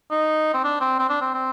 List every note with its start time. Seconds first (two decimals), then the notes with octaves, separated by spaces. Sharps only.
0.11 D#4
0.54 C4
0.64 D4
0.81 C4
0.99 C4
1.09 D4
1.21 C4
1.34 C4